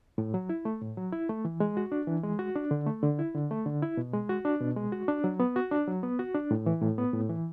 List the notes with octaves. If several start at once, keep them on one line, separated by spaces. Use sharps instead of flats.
A2
F#3
E4
A3
A2
F#3
E4
A3
E3
G#3
F#4
D4
E3
G#3
F#4
D4
D3
A3
D3
E4
D3
A3
D3
E4
B2
G#3
F#4
D4
B2
G#3
F#4
D4
F#3
B3
F#4
D4
F#3
B3
F#4
D4
A2
E3
A2
B3
A2
E3